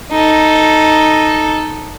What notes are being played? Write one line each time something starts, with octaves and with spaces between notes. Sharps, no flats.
D#4 A4